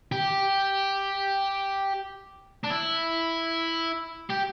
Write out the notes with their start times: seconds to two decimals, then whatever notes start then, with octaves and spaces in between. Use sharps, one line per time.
0.12 G4
2.64 D4
2.70 E4
4.30 G4